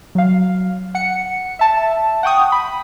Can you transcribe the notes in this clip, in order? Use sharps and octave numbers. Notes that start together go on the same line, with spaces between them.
F#3 F5
F#5 C#7
E5 A5
F#5 G5 C#6 D#6
B5